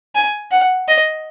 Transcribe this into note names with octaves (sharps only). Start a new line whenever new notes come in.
G#5
F#5
D#5